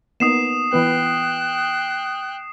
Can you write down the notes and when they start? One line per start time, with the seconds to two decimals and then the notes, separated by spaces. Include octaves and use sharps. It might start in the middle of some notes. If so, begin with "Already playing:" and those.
0.20 A#3 B3 D#4 D#6 C7 E7
0.73 E3 B3 B4 G5 F#6